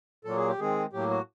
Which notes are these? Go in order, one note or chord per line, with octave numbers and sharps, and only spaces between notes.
A#2 F#3 A#3 A4
G#4
G4
D#3 G#3 C4 G#4
A2 F#3 A#3 G4
F#4